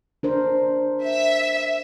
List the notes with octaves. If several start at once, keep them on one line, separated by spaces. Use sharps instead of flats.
D4 A#4 C5
E5